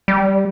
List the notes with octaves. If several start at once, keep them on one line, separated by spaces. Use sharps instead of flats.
G3